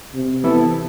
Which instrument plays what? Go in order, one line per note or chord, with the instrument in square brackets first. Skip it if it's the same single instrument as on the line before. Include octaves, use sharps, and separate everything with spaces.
[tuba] C3
[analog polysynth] E3 B3 E4 A4